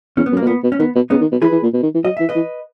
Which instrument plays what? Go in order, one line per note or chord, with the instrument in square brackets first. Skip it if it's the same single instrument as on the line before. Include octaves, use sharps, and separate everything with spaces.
[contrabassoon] E2 [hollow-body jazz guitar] C#4
[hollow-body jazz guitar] B3
[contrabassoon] F#2
[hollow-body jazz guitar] A#3
[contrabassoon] B2
[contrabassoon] A#2 [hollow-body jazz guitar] B3
[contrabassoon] B2
[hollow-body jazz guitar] C#4
[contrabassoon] D#3 [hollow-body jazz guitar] B3
[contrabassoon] B2
[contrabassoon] C#3 [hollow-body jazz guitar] B3 D#4
[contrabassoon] D#3
B2
[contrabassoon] E3 [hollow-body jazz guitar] G#4 B4
[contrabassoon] E3
A#2
B2
D#3
E3
[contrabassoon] F#3 [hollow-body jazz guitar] D#5
[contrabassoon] E3 [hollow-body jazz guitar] E5
[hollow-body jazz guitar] B4 D#5
[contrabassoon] E3